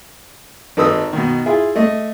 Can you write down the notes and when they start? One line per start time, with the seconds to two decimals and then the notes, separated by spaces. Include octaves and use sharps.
0.77 G#1 D#4 A4 B4 D#6 E6
1.13 B2 D#3
1.46 E4 F4 G#4
1.76 A3 D#5